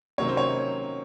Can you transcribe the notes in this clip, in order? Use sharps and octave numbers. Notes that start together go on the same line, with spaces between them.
C3 D#3 F#3 A#3 C#4 C#5
C5
C#5